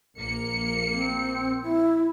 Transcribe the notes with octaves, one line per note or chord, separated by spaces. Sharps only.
A#1 A#3 C#7
C4
E4